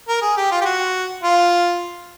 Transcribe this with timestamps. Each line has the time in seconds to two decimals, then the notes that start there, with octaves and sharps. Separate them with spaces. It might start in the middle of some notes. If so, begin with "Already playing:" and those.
0.08 A#4
0.22 G#4
0.37 G4
0.52 F4
0.61 G4
0.65 F#4
1.24 F4